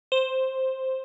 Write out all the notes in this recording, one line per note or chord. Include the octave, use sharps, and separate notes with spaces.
C5